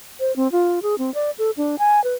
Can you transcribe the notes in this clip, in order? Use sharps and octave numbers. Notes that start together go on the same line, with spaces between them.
C5
C4
F4
G#4
C4
D5
A4
D4
G#5
B4